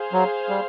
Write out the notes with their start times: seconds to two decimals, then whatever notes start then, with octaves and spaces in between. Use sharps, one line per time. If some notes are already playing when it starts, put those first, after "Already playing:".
Already playing: G#4 C5 F5
0.13 F#3
0.49 G3